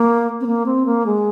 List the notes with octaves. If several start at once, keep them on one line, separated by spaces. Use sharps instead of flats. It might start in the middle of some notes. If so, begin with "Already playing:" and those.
Already playing: A#3
C4
A#3
C4
A#3
G#3